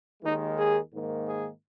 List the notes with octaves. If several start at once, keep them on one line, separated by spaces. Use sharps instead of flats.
D#2 D#3 G#3 D#4
G#4
G#2 D#3 A#3
G#4